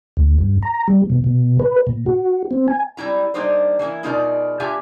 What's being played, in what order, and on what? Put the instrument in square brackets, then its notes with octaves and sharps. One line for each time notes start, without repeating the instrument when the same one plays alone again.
[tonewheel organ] D2
G2
A#5
G3
B2
B2
B4
A#2
F#4
C4
G#5
[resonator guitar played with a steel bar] G3 C4 E4 A#5
G3 A#3 D4 D#4 G4 C5
E3 A#3 D#4 E4
B2 G#3 D#4 F4 A#4 D5
A#2 D4 F4 G4 E5 G#5